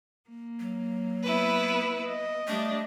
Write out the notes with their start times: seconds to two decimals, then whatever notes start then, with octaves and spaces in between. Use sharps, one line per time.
0.29 A#3
0.60 F#3
1.23 B3 E4 B4
2.06 D#5
2.47 G3 A3 D4